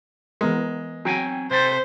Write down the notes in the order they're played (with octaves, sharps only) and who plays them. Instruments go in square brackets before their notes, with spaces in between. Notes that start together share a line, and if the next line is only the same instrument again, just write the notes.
[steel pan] E3 B3 A#4 [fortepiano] G#3
[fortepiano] F#3 [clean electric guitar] C4 G5 G#5
[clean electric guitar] C3 G4 A4 [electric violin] C5